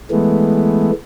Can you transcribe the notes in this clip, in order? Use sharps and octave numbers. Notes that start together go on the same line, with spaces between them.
E3 G#3 A3 B3